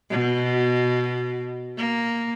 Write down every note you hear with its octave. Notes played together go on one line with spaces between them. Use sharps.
B2
A#3